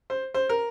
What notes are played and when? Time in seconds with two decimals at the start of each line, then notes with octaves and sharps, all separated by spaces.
0.10 C5
0.34 C5
0.49 A#4